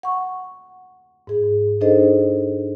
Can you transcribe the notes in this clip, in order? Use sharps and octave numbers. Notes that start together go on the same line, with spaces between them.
F#5 C#6
G#2 G#4
D4 D#4 G#4 A4 C5 D#5